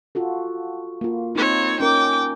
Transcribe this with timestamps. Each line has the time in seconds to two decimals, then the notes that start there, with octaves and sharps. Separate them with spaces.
0.15 F4 F#4 A4
1.01 A#3 F4
1.36 C4 D#4 C#5
1.80 C#4 A#4 G5 D6